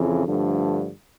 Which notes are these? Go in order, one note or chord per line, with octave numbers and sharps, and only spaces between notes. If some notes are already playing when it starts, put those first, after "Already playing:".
Already playing: F2 C#3 E3
G2 D3 F3 A3